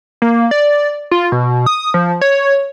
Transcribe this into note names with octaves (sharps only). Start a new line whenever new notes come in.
A#3
D5
F4
B2
D#6
F3
C#5